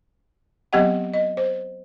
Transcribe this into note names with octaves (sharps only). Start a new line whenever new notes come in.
F#3 B3 C4 G4 D#5 F#5
D#5
C5